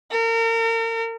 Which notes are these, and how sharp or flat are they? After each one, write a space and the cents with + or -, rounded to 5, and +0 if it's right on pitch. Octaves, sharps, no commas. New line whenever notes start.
A#4 -35